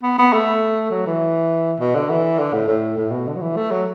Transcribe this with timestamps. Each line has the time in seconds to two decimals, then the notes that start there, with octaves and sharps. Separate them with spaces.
0.03 B3
0.19 B3
0.33 A3
0.91 F#3
1.06 E3
1.80 B2
1.95 D3
2.10 E3
2.39 D3
2.54 A2
2.68 A2
2.97 A2
3.11 B2
3.27 D3
3.36 F#3
3.41 E3
3.56 A3
3.71 F#3